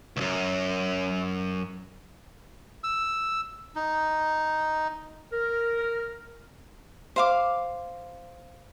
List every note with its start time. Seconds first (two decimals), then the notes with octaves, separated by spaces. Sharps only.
0.17 C#2 F#2
2.84 E6
3.76 D#4
5.32 A#4
7.16 C5 F5 D6